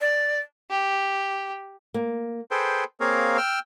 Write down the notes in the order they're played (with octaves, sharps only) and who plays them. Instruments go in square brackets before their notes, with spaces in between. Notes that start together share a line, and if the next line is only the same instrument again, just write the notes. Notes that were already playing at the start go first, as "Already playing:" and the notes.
[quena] D5
[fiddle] G4
[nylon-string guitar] A#3
[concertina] G#4 A4 B4 C5 G5
A#3 C4 G#4 A#4 C#5 F5
G5 E6 F6